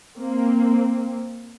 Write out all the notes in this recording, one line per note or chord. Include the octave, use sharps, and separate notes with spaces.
A#3 C4